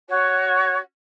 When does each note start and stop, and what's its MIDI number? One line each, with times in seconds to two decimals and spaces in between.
0.10 0.77 66
0.10 0.77 73